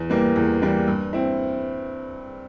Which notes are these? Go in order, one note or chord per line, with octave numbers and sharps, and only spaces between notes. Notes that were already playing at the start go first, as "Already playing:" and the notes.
Already playing: E2
E3 G3 A#3
E2
E3 G3 A#3
G2
C4 E4